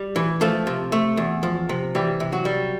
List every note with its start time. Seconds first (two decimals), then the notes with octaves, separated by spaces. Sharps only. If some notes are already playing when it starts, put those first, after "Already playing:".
Already playing: G3
0.16 E3
0.41 F3 A3 A4
0.67 C3
0.92 A3
1.17 E2
1.43 F3
1.69 C3
1.95 E3 G3 G4
2.20 C3
2.32 F#3 F#4
2.45 G3